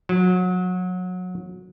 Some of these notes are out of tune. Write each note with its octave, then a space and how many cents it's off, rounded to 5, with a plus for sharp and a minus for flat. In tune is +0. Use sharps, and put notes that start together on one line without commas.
F#3 -25